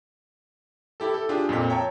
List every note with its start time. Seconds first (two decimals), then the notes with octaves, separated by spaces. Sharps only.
1.00 E4 G4 A4
1.14 A4
1.29 D4 F4 G4 G#4
1.49 F2 A#2 A#3 B6
1.70 C#5 E5 G5 A5 A#5